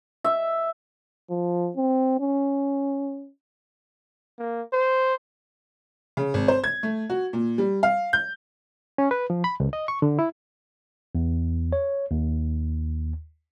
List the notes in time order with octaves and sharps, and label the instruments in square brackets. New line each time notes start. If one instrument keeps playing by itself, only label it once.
[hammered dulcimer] E5
[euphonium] F3
C4
C#4
[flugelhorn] A#3
C5
[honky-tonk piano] C#3
G#1
C5
G#6
A3
F#4
A#2
G3
F5
G6
[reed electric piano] C#4
B4
F3
B5
C#2
D#5
C#6
D3
E4
[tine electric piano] E2
C#5
D#2